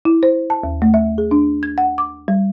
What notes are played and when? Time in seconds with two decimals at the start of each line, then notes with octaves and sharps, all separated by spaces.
0.05 E4
0.23 C5
0.50 A5
0.63 D#2
0.82 A3
0.94 E5
1.18 G#4
1.31 D4
1.63 G#6
1.78 F#5
1.98 D6
2.28 G3